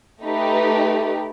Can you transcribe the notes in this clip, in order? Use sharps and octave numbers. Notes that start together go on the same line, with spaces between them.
A3 D#4 G4 B4